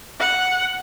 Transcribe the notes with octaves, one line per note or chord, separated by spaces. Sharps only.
F#5